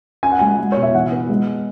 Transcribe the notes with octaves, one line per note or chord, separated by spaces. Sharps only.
C#4 G#5
F#5
G#3 G#5
G#3
B2 C#5
E5
E3 F#5
B3
G#3